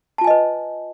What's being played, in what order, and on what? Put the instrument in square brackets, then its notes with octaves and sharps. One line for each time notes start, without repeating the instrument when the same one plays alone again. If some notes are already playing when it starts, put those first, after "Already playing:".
[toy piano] A5
F4
G#5
D#5
B4